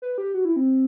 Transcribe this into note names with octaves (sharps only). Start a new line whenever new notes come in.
B4
G4
F#4
E4
C4